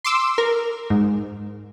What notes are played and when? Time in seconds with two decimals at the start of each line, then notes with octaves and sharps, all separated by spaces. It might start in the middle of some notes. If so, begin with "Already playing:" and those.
0.05 C6 D6 E6
0.38 A#4
0.90 G#2